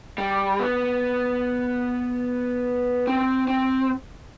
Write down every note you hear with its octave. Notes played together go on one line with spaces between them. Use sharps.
G3
B3
C4
C4